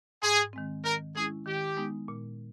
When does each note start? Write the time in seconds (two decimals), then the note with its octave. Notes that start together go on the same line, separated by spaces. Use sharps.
0.22 G#2 G#4
0.53 D#3 G#3 C4
0.85 D#3 A#4
1.15 G#3 C#4 E4 G#4
1.46 D#3 G4
1.77 G#3 B3 D#4
2.08 A#2